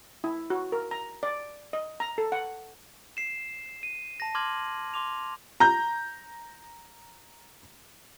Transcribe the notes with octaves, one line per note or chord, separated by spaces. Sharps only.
E4
F#4
A#4
A#5
D5
D#5
A#5
A4
F#5
C7 E7
D#7
A5 A#6
C6 D6 F6 G#6 F#7
C6 D6 F7
A#5 G6